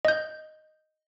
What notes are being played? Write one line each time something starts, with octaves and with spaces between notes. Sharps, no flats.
D#5 G6